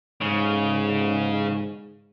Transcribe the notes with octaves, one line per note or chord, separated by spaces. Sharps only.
G#2 C#3